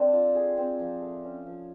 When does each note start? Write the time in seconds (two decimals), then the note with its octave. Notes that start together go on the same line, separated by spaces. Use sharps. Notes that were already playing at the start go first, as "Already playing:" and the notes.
Already playing: C4 D4 A4
0.13 F4
0.35 G#4
0.57 C4
0.79 F3
1.02 A3
1.24 C#4
1.46 F3